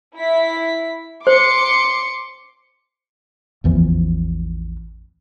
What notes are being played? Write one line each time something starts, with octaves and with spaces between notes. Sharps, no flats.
E4 B6
C5 C6 D6 C#7
A1 E2 E3 F3